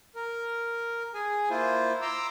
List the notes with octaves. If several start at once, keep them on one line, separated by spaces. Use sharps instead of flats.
A#4
G#4 G#5
A#3 E4 F4 C5
A#5 C6 D6 E6